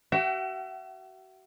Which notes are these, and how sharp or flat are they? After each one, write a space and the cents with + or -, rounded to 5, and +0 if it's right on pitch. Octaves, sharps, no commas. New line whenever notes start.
F#4 +40 E5 +30 G5 -45